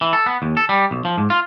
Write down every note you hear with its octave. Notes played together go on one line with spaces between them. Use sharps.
E3
A4
B3
D#2
A4
G3
B1
F3
G#2
F4